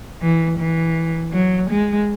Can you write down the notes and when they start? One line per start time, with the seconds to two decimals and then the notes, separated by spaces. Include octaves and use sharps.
0.22 E3
0.59 E3
1.33 F#3
1.70 G#3